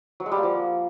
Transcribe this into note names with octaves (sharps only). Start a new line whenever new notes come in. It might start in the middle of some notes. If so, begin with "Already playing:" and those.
F#3
G#3
G3
A#3
F3